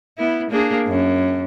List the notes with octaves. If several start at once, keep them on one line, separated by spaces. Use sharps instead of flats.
B3 E4
A#3 D4 G#4
F#2